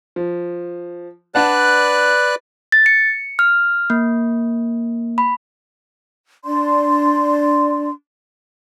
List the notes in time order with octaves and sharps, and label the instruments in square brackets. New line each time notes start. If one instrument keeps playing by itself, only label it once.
[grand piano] F3
[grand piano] D4 F#5 A5 [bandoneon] B4 D5 F#6
[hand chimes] A6
C#7
F6
A#3
B5
[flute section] D4 D5 C6